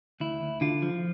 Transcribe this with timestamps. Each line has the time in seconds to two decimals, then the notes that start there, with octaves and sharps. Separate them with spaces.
0.20 D2 E4
0.42 D2
0.61 D3 F4
0.82 F3